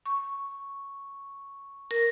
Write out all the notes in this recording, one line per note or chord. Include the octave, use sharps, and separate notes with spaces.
C#6
A#4